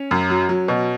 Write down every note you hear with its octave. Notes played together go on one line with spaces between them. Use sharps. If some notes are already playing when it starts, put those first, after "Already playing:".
Already playing: C#4
F#2
F#3
F#3
B2